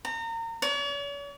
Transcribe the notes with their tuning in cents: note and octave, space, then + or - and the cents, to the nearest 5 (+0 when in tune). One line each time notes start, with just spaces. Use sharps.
A#5 -30
C#5 +45